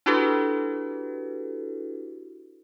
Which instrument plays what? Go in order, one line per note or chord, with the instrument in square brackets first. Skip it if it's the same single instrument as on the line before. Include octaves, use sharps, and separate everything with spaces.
[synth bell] D4 E4 F#4 G4 A4 B4